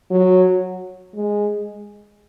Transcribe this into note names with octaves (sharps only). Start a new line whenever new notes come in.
F#3
G#3